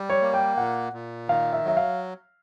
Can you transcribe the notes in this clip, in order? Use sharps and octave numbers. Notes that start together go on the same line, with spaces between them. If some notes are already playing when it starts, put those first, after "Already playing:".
Already playing: G3
C#5
A#3
G5
A#2 F#5
A#2
D#3 F5
E5
F#3 E5
F5